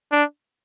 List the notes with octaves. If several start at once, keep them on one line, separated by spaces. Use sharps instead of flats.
D4